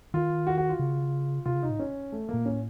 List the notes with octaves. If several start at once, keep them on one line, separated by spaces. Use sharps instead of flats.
D#3 F4
F#4
F#4
F4
C#3
C3 F4
C#3
C3 D#4
A2
C#4
A3
A#3
A#2
A2 C#4